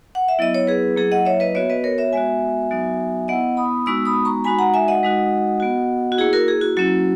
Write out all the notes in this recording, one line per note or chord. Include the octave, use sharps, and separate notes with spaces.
F#5
E5
F#3 B3 E4 D#5
C#5
G#4 B4
F#3 A#3 E4 G#4
D#5 F#5
C#5 E5
B4 D#5
B3 F#4 C#5 E5
B4 D#5
A#4 C#5
C#5 E5
G#3 B3 F#4 E5 G#5
F#3 B3 D#4 F#4
B3 E4 D#5 F#5
B5 D#6
G#3 B3 D#4 F#4 C#6 E6
B5 D#6
A#5 C#6
G#3 D#4 F#4 G#5 B5
F#5 A#5
E5 G#5
D#5 F#5
G#3 D#4 F#4
B3 F#4
F#4
A#3 E4 G#4
F#4 A#4
G#4
F#4
F#3 A#3 C#4 E4 F#4